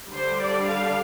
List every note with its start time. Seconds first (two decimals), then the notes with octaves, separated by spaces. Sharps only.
0.11 D3 G3 D4 C5
0.40 D5
0.68 F5